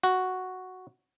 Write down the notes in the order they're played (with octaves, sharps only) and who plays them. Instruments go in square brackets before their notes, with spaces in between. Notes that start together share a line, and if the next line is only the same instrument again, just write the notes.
[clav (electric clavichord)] F#4